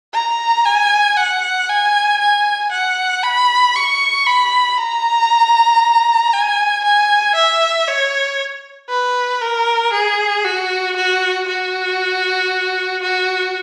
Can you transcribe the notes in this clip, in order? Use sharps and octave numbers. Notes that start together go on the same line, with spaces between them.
A#5
G#5
F#5
G#5
G#5
F#5
B5
C#6
B5
A#5
G#5
G#5
E5
C#5
B4
A#4
G#4
F#4
F#4
F#4
F#4